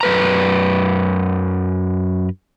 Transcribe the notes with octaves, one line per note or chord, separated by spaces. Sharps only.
F#2 B4 A#5